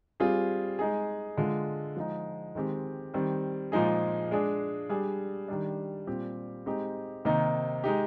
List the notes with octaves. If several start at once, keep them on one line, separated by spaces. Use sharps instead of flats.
G3 C4 F4 G#4
G#3 D#4 G#4
D3 G#3 D4 F4
F3 G#3 D#4
D#3 G#3 C4 G4
D#3 G3 C4
A#2 F3 G#3 D#4 G#4
G#3 D4 G#4
G3 D4 G#4
D#3 G3 D4
A#2 G3 C4 G4
G#3 C4 D#4 G4
C3 D#3 A#3 D#4
G#3 D#4 G4